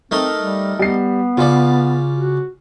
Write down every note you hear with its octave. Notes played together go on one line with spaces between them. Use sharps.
A3 C4 D#4 A#4
G3
G3 B3 C7
C#3 F4 D5
F#4